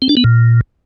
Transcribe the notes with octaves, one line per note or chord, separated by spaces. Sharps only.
C4
D4
B3
A#2